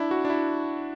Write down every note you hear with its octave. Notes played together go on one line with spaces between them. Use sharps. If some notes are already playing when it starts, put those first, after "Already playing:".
Already playing: D4 E4
F#4
D4
E4